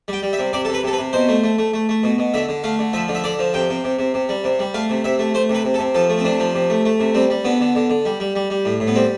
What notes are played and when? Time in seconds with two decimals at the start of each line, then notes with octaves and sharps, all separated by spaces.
0.08 G3 G5
0.23 G3
0.33 E5
0.39 C3
0.53 C3 D5
0.65 A4
0.69 C3
0.74 B4
0.83 C3 A4
0.93 B4
0.99 C3
1.13 B2 C5
1.29 A3
1.44 A3
1.58 A3
1.74 A3
1.89 A3
2.03 B2
2.18 B2
2.34 D3 E5
2.49 D3
2.64 A3 F5
2.79 D3
2.93 F3 E5
3.08 D3
3.15 E5
3.24 D3 D5
3.39 F3
3.54 C3 G5
3.69 C3
3.84 C3
3.99 C3
4.14 C3
4.29 G3
4.44 C3
4.59 G3
4.74 A3 F5
4.90 C3
5.04 C3 E5
5.19 A3
5.34 A3 C5
5.49 C3
5.55 B4
5.64 C3
5.74 A4
5.79 C3
5.95 F3 A4
6.10 A3
6.19 C4
6.25 C3 D4
6.40 F3
6.55 C3
6.70 A3
6.85 A3
7.00 C3
7.15 G3 C4
7.30 G3
7.45 D3 B3
7.60 D3
7.75 D3
7.90 D3
8.05 G3
8.20 G3
8.35 G3
8.50 G3
8.65 A2
8.80 A2
8.87 B3
8.95 G3 C4